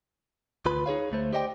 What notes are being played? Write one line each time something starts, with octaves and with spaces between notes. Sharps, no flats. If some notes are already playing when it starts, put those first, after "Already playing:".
D2 F4 B4 B5
D#4 G#4 C#5 F5
D2 A3 C5
G4 C5 D5 D#5 F5 G5